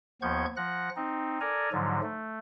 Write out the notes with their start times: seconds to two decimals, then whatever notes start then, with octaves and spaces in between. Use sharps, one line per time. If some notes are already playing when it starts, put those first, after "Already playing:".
0.22 D#2 F3 B3 C#6 G6 G#6
0.57 F3 F#5 F#6 A#6
0.96 C4 D#4
1.41 A4 A#4 D5 G#5 A#5
1.72 G#2 D3 F3 F#3
2.03 A3